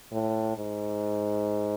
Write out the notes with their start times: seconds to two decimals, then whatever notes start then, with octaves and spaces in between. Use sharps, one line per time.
0.12 A2
0.57 G#2